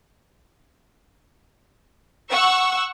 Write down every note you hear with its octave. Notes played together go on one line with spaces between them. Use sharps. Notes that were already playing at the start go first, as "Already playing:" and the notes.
F#5 C#6 E6